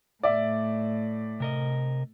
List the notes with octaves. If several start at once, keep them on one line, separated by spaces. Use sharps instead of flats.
A2 D5 E5
C3 A#4 D#5